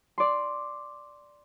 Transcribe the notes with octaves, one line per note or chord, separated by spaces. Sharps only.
D5 C6